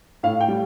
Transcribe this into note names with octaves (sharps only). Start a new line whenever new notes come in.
A2 F5
G5
G3